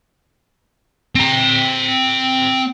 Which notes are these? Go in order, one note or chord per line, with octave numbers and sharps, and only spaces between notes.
C4 A#5